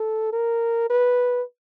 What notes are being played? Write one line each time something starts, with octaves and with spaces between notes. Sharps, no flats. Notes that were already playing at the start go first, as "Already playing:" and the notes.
Already playing: A4
A#4
B4